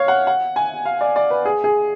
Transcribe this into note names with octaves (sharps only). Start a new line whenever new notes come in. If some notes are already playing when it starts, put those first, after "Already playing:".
Already playing: C#5 F5
F#5
F#5
G#5
F5
D5
D5
B4
G#4
G#4